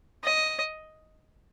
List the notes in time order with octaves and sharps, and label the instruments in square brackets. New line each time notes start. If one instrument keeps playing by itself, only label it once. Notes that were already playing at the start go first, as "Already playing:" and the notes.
[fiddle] D#5